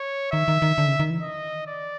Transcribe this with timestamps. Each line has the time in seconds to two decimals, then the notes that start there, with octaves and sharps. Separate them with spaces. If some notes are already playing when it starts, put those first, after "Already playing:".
Already playing: C#5
0.32 D#3 E5
0.48 D#3
0.62 D#3
0.78 D3
0.88 C#3
1.00 D#3
1.10 E3
1.22 D#5
1.67 D5